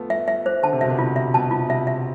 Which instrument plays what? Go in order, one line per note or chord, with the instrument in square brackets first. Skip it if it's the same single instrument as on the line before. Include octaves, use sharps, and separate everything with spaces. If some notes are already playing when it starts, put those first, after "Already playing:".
Already playing: [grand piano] F3 A3 B3
[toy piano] E5
E5
C5
[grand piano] D3 [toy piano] A5
[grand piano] C3
[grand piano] B2 [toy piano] E5
[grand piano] C3
[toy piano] F4
E5
[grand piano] B2 [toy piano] A5
[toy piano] F4
[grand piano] C3 [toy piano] E5
[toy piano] E5